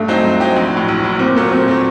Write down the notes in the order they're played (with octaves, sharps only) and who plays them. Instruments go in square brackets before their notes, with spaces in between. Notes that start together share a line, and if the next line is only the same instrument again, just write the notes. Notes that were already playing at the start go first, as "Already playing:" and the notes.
Already playing: [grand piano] G2 [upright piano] A3
[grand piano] F#3 C4 D#4 G4
G2
F#3 C4 D#4 G4
A#1
A2 F#3
A#1
A2 F#3
[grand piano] A#2 [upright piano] C4
[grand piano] F#3 A3 [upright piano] A#3
[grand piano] A#2 [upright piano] C4
[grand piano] F#3 A3